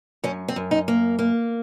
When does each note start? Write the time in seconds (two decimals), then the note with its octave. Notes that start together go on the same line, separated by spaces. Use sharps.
0.24 F#2 C#4
0.48 C4
0.56 F#2
0.71 D#4
0.88 A#3
1.19 A#3